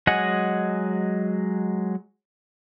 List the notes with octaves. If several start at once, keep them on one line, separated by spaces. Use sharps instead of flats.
F#3 G#3 D#5 F#5 G#5